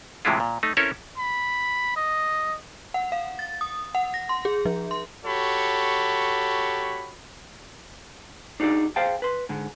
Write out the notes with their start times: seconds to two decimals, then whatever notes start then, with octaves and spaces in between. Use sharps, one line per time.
0.25 A2 C3 E3 G#3 E4 F4
0.40 A#2
0.63 A3 D#4
0.77 C4 C#4 E4 A4 A#4 C#5
1.18 B5
1.96 D#5
2.94 F#5
3.12 F5
3.39 A6
3.61 D#6
3.95 F#5
4.14 A#6
4.29 C6
4.45 G#4
4.65 F3
4.91 C6
5.25 F#4 G4 A4 C#5 B5
8.60 D4 D#4 F#4 G#4 D5
8.96 G#4 C5 F5 G5 A5
9.22 B4 C6
9.49 G#2 D3